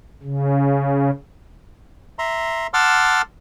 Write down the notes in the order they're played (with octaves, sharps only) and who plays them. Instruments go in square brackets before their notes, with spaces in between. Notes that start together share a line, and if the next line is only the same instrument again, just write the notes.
[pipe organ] C#3
[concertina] E5 A#5 C6
F#5 A5 C6 D6 E6 F6